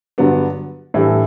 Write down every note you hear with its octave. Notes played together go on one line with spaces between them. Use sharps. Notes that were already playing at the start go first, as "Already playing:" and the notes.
G2 D3 F#3 B3 D4
A2 E3 G3 D4 A4